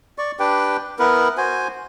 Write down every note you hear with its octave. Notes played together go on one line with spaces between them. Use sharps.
D5 C#6
D4 G4 B4 G5
B3 E4 A#4 B4
F#4 C5 G#5